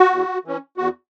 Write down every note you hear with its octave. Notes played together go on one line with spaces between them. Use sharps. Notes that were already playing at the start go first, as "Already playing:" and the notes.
Already playing: F#4
E2
E3 C#4
E2 F#4